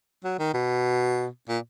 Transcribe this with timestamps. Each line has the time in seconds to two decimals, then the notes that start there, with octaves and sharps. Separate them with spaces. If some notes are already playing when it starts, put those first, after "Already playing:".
0.24 F#3
0.39 D#3
0.54 B2
1.49 A#2